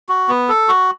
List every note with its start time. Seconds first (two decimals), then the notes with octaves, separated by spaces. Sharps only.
0.09 F#4
0.29 B3
0.49 A4
0.68 F#4